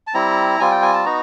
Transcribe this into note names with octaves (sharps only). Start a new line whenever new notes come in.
A5
G3 C4 E4 A#5
G3 C4 F4 G#5
G5
G#5
A5
B3 D#4 F#4 A#5